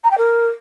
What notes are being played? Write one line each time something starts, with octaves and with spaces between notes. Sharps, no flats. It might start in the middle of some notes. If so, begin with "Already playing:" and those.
A#5
G5
A#4